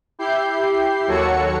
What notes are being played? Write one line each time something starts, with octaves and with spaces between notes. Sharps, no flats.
E4 G4 G6 C7
D#2 F#3 F#4 A4 C#5 C#7